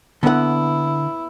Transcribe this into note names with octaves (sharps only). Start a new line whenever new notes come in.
D3 B3 E4 F#5